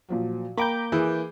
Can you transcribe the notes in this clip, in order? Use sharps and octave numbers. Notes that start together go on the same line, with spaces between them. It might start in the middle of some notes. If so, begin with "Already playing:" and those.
A#2 F3 F#3
A#3 G5 A#5 B5 D6 G6
E3 G#4